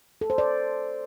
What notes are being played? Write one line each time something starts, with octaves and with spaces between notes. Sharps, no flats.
A4
C5
D5